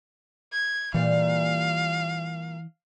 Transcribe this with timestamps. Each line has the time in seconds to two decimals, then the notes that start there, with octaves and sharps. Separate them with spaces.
0.52 G#6
0.94 A#2 E3 G3 F5